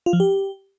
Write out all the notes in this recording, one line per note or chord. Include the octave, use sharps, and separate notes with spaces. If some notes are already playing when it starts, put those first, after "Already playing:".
F4
F3
G4